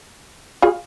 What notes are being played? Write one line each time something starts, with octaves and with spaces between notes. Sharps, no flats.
F4 G#4